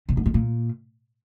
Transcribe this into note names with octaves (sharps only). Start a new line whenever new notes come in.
C3
G#2
A2
A#2